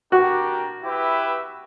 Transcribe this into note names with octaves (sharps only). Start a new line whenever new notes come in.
D4 F#4 G4 A#4
E4 G4 B4 E5